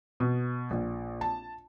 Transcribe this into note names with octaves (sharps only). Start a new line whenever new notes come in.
B2
A#1
A5